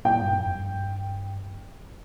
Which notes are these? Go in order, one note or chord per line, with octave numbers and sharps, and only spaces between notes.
A#2 G5
G2
F2
G2